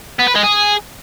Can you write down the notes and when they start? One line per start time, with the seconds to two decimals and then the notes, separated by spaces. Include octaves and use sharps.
0.19 B3
0.28 B4
0.36 G#3
0.44 G#4